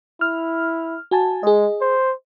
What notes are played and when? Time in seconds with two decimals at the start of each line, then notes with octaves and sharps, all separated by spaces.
0.21 E4 F6
1.11 F#4 G#5 A5
1.43 G#3 G#4 D#5
1.81 C5